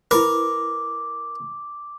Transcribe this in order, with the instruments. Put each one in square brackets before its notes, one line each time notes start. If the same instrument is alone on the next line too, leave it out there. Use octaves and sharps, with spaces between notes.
[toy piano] E4 B4 B5 [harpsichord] A#4 [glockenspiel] D6